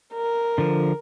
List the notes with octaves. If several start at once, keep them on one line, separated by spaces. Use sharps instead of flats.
A#4
D3 F3